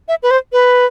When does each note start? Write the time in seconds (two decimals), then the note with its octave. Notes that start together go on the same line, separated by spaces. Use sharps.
0.08 E5
0.23 B4
0.31 C5
0.52 B4